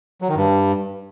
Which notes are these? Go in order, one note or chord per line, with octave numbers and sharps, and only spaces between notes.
F#3
D#3
G2